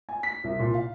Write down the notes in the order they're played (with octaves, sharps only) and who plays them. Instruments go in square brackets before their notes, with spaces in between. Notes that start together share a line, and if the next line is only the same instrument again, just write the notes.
[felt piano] G#5
B6
C2
A#2
F5